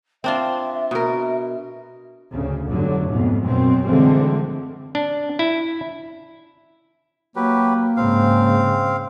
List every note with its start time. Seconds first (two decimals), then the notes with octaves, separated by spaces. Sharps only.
0.24 C4 D4 F4 E5
0.91 B2 A#4
2.33 D2 C#3
2.68 F1 G2 D3 F#3
3.11 F2 G#2 B2
3.42 F#2 B2 C4
3.85 D3 E3 F3 G#3 A3 C4
4.95 D4
5.39 E4
7.36 F#3 A#3 G4 B4
7.97 G#2 C#3 C4 F5